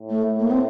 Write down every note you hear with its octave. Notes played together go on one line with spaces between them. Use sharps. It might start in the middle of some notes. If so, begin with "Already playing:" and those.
Already playing: A2
A3
A#3
C4